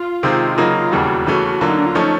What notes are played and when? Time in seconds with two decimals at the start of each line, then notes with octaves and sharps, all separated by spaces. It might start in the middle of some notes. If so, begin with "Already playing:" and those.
Already playing: F4
0.23 C3 D#3 G#3 C4
0.58 C#3 F#3 A#3 D#4
0.91 E1 D#2 C#3 E3 G3 F#4
1.26 C#3 E3 A3 C#4
1.61 D3 F#3 A#3 F4
1.70 D#4
1.78 D4
1.86 F4
1.95 F3 A3 C#4 D#4